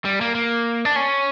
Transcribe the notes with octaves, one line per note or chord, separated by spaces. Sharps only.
G3
A#3
A#3
D4
C#4